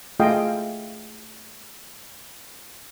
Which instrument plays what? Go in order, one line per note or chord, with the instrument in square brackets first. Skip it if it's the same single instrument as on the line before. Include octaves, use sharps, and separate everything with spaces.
[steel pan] A3 F4 G#4 D#5 F5 G5